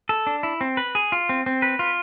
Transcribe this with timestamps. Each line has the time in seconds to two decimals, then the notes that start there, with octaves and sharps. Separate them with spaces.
0.09 A4
0.27 D4
0.43 E4
0.61 C4
0.77 B4
0.95 G#4
1.12 F4
1.29 C4
1.46 C4
1.62 B4
1.79 F4